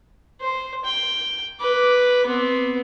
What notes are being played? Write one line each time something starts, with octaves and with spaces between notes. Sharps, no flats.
C5
G5
B4 D6
B3 C4